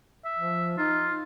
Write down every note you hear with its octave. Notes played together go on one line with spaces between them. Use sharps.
E5
F3
D#4 F4